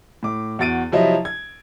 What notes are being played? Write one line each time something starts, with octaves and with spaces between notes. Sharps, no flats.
A2 D6
E2 F#4 A6 D7 D#7
C3 F3 F#3 E4 D#5 E5
G#6